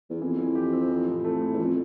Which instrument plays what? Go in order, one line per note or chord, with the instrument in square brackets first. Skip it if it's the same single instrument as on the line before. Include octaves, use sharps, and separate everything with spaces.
[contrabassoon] E2
[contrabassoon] F2 [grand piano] E3
[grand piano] E3
G4
C4
E3
A2
A3
E3
[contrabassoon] E2
[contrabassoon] F2 [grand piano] F3